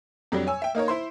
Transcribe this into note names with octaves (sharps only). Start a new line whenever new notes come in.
F2 F#3 G3 D4
C#5 G#5 E6
E5 G5
A#3 D#4 A#4 C#5
E4 C5 C6